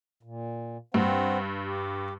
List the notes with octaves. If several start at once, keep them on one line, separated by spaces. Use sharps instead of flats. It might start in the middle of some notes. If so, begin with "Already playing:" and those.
A#2
G2 C4 C5 F#5
G4